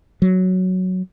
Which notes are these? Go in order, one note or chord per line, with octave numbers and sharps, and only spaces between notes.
F#3